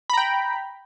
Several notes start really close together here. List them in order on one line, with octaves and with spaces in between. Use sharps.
B5 A#5 G5